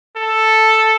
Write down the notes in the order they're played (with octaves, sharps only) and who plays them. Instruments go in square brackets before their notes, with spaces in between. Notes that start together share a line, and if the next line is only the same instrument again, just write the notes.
[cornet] A4